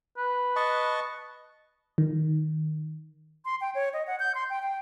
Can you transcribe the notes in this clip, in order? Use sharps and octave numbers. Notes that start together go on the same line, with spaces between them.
B4
D#5 A5 C#6
D#3
C6
G5
C#5
D#5
F#5
G6
C6
G5
G5